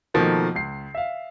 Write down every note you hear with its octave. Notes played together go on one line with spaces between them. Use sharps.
B2 D#3 F3 A3 A#3
C#2 C7
E5 F5